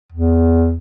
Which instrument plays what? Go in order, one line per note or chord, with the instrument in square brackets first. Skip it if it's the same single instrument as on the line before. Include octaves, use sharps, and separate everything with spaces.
[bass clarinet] E2